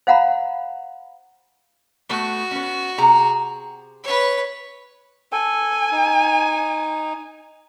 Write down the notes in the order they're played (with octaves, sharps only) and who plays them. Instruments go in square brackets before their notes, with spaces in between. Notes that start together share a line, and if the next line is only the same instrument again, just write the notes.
[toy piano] C5 F5 F#5 A#5 B5
[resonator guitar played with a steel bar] A3 B3 [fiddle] F#4
[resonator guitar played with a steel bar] B3 C#4
C3 G#4 A#5
[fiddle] B4 C#5
[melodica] A4 [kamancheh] G#5
[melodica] D#4